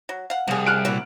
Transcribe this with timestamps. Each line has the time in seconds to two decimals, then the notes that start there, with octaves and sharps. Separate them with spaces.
0.09 F#3
0.30 F5 F#5
0.48 C2 F3 G#4
0.66 F6 F#6 D7
0.85 A#2 E4 F#4